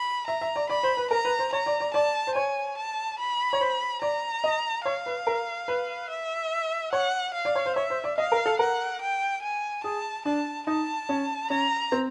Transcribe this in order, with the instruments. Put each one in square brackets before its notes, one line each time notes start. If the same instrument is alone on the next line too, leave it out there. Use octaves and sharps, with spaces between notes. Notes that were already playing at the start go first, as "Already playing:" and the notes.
Already playing: [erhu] B5
[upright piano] E5 [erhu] A#5
[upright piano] E5
D5
[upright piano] D5 [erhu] B5
[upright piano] C5
B4
[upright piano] A#4 [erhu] A#5
[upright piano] B4
C5
[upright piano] C#5 [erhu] A#5
[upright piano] D5
D5
[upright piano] D5 [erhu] A5
[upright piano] C5
[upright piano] C#5 [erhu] G#5
[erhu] A5
B5
[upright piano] C#5
C5
[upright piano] D5 [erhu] A#5
[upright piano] D#5
[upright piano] C#5 [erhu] F5
[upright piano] B4
A#4
B4
[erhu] E5
[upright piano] C#5 [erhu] F#5
[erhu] F5
[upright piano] D5
C#5
C5
[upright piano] C#5 [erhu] E5
[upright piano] C5
D5
[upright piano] D#5 [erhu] F5
[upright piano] A#4
A4
[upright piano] A#4 [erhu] F#5
[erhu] G5
G#5
[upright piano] G#4 [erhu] A5
[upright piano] D4 [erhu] A5
[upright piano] D#4 [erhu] A5
[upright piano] C#4
[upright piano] C#4 [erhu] A#5
[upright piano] C4